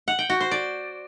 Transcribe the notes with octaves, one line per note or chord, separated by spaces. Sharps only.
F#5
G5
F#4
C5
D5